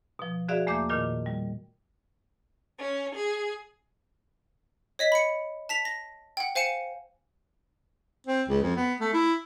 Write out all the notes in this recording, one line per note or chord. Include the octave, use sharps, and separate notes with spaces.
B2 F3
F#4 G#4 D5 E5 F5
E2 A3 A#3 E5 D6 G6
A#2 D#3 F4 F6
G3
C#4
G#4
C#5 D#5 B6
B5 C#7
A5 B6 F7
A#6
F#5 G5
C5 F5 G#5 C#7 E7
C4
C#2
F2
B3
A3
E4